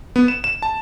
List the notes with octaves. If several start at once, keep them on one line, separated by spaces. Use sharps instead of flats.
B3
E7
E7
A5